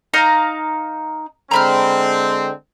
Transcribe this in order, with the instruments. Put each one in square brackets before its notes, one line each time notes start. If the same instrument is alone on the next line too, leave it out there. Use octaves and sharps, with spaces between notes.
[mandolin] D#4 F5 A#5
[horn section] D3 G#3 C4 [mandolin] A#5 B5 F6